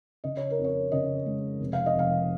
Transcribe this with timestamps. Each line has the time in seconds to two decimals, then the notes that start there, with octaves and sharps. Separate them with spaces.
0.24 C#3 D#5
0.37 C#5
0.51 A#4
0.59 F2
0.64 C#5
0.92 C#3 D#5
1.26 G#3
1.60 F1
1.73 F5
1.86 D#5
1.95 F1 F5